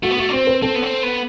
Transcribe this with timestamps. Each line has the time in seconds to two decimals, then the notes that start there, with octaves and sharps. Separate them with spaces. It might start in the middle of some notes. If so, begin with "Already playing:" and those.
0.03 A3 F#4
0.11 B3
0.17 A3 F#4
0.29 D4
0.33 C4 C5
0.47 B4
0.62 C4 A4
0.75 B3
0.82 C4
1.03 B3